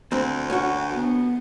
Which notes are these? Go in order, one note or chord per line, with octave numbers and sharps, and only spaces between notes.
D2 C4
C#4 F#4
B3